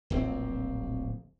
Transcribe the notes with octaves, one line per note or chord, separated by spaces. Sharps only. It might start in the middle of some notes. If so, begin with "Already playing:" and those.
D1 A#1 C4